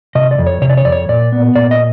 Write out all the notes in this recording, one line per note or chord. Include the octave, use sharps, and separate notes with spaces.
C3 D#5
D5
F2
C#5
C3 C#5
D5
C#5
F2 D5
C#5
A#2 D5
B3
A#2 D5
D#5